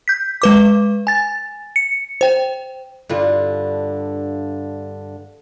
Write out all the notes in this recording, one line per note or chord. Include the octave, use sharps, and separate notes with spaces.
G6 B6
G#3 B4 D6
G#5 A6
C#7
C5 G5
G2 D3 F4